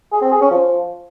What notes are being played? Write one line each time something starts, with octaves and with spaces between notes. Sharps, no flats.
G#4
C4
G#4
C#4
F3